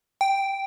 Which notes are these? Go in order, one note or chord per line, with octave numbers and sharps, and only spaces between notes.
G5